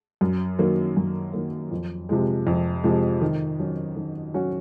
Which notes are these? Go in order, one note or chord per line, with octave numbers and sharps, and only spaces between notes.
F#2
D#3 F#3 A#3
F#2
D#3 F#3 A#3
F2
C3 F3 G#3
F2
C3 F3 G#3
D#3
F#3 C#4 F#4
D#3
F#3 C#4 F#4